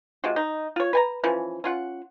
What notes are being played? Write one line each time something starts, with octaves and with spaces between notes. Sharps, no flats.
C3 G#3 F4 F#4
D#4
F4 C#5
B4 G#5 A#5
E3 F3 C#4
C#4 F4 F#5